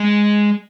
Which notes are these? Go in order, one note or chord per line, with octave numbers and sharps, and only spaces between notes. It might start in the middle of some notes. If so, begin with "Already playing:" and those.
Already playing: G#3